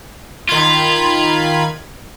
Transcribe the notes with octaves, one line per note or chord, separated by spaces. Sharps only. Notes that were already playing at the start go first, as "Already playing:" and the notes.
D#3 F4 B5 G#6